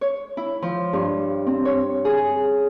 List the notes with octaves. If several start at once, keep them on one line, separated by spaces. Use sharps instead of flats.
C#5
E4
F3
G2
C4
C#5
G#4